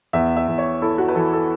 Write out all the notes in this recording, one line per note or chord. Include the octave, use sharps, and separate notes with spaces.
E2 E5
E5
E2
C#5
E4 A4
F#4
B4
E3 A4
A4